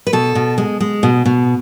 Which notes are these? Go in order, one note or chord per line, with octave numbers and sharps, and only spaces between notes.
B4
B2 A4
B2
G#3
G#3
B2
B2